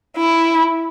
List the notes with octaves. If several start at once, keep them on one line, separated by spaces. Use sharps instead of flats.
E4